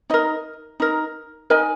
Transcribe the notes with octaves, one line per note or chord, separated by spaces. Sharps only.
D#4 A#4 D#5
D#4 A#4
D#4 A#4 D#5 G#5